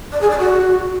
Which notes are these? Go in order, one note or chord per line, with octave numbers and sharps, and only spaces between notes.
D5
G#4
D5
F#4